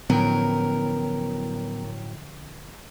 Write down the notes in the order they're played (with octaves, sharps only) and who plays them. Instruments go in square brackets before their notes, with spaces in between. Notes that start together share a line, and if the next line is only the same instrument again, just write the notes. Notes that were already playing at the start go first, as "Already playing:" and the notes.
[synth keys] A2 F#3 G5 [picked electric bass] D3 F3 C#4 [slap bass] B3 [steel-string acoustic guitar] A#4